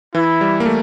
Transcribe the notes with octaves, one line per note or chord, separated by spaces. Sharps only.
E3 E4
G3
A#3
A3